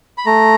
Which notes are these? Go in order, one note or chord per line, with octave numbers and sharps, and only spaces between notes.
B5
A3 A#5